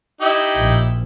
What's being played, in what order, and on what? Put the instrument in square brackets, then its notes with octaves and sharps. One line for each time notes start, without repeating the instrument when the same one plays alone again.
[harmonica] D#4 E4 G4
[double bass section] A#1